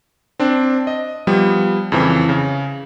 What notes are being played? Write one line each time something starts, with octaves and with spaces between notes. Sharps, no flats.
C4 D4
D#5
F3 G3 B3
F2 C#3 E3 C4
C#3